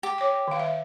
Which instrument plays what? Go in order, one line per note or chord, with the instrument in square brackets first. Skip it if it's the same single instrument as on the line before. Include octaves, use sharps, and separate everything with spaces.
[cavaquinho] G4
[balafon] C#5 D6
D#3 F5
E5